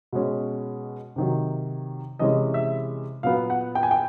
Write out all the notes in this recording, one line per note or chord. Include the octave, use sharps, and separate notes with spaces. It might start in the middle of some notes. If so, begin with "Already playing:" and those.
B2 G#3 C#4
C3 D#3 F#3
C3 E3 G#3 C#4 D#5
E5
A#2 F#3 B3 F5
F#5
G5
G#5
G5